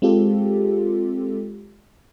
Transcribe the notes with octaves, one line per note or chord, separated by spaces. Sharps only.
G#3 C4 F4 G4 A4